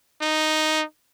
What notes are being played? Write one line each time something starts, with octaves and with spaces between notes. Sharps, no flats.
D#4